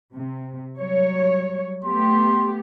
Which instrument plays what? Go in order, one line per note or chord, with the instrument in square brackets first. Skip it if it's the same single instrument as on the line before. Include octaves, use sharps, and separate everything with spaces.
[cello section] C3
F#3 G3 C#5
[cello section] A3 B3 G4 [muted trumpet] C6